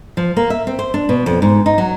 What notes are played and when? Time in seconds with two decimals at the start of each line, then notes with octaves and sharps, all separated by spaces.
0.17 F3
0.37 A#3
0.50 E5
0.67 C4
0.79 C5
0.94 D4
1.09 B2
1.26 F2
1.42 G#2
1.66 D#4
1.78 F#3